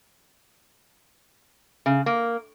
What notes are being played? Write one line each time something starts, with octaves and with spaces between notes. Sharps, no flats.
C#3
A#3